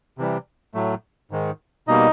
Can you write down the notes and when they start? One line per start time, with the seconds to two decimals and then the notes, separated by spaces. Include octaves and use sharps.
0.18 C3 E3 G3
0.74 A2 F#3 A3
1.31 G#2 D#3 G#3
1.88 B2 G3 A#3 D#4 D#5